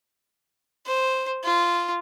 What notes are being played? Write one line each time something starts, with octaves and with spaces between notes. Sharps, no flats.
C5
F4